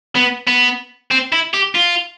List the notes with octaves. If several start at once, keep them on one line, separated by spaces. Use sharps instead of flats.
B3
B3
C4
E4
G4
F4